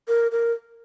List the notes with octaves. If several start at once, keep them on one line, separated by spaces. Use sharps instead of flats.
A#4
A#4